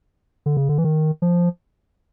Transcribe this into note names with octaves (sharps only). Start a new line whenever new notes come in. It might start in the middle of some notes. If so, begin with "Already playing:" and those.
D3
C#3
D3
E3
D#3
F3